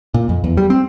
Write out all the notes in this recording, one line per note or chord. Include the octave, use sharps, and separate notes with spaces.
A#2
F2
E2
G3
C4